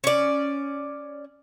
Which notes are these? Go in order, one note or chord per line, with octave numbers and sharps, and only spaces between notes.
C#4 D5